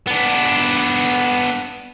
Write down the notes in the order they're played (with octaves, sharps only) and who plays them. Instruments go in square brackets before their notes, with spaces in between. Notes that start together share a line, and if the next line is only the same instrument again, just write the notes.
[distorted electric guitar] B3 D4